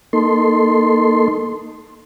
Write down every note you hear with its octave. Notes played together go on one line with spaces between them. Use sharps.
A#3 D#4 A4 C6